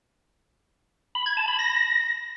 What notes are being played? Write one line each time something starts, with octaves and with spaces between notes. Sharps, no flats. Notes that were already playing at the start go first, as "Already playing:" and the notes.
B5
G#6
A5
B5
A#6